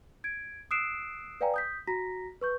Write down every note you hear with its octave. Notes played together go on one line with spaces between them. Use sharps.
G#6 D7
D#6 E6 F#6 C7 D7 E7
B4 D5 F5 G5 G#5 A#5
D#6 G6 B6
F#4 A#5 A#6 B6
B4 C#6 G6